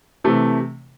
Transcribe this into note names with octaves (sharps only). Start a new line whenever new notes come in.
C3 E3 A3